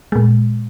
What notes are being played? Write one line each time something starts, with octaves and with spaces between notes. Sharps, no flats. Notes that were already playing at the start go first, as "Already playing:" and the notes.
A#2 G#3